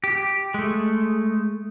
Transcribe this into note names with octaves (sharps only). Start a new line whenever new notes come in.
G4
G#3 A3